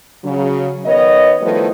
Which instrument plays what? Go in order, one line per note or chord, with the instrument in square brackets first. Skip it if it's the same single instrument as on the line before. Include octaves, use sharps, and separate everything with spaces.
[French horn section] C#3 F#3
D#3 B3 C#5 D#5
D#3 F3 G3 A3 E4 B4